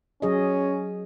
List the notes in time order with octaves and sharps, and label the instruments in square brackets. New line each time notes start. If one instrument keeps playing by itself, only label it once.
[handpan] F#3 G#4 D#5 [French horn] C#4